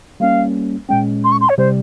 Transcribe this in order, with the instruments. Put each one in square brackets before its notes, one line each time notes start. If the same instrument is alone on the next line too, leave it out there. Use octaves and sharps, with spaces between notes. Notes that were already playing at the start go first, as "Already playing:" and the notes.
[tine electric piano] G3 A#3 C#4 [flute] F5
[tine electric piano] A#2 G#3 C#4 [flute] G5
[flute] C6
C#6
C6
C#5
[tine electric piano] C3 G3 [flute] C5